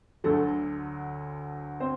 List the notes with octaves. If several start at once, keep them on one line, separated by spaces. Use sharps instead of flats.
D2 D3 F#3 A3 A4
C4 C5